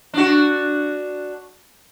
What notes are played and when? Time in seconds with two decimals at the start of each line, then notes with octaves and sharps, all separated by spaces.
0.14 D4 F#4